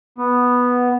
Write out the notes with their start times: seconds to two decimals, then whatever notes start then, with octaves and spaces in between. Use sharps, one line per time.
0.18 B3